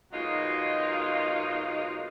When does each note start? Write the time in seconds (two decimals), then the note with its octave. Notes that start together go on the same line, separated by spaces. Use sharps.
0.13 B2 F#3 G#3 A#3 D#4 F4